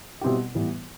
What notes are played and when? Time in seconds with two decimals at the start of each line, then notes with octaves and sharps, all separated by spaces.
0.21 B2 G3 C4 E4 G4
0.55 A2 E3 G3 B3